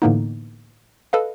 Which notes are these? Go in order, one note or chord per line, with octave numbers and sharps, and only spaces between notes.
A2 D3 E3 A#3 B3 D#4
A4 B4 D#5 F5